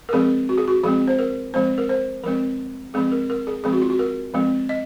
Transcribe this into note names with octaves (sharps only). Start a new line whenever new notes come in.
A#4
F3 G#3 C4 G#4
F#4
G#4
F#4
F3 G#3 C4 G#4
C5
A#4
F3 G#3 C4 C5
A#4
C5
F3 G#3 C4 A#4
F3 G#3 C4 G#4
A#4
A#4
G#4
F3 G#3 C4 G#4
F#4
F4
F#4
A#4
F3 G#3 C4
D#5